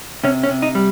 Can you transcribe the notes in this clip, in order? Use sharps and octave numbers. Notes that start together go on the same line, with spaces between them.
C3 C#4
C#4
C3
D#4
G3